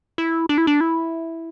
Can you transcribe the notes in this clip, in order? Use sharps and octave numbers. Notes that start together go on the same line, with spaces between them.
E4
D4
E4
D4
E4